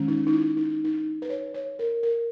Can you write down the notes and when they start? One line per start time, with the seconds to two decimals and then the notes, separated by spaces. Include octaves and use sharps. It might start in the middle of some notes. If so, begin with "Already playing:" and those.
Already playing: D#3 G#3 C#4
0.08 D#4
0.27 D#4
0.33 E4
0.57 D#4
0.84 D#4
1.22 B4
1.30 C#5
1.54 C#5
1.79 A#4
2.03 A#4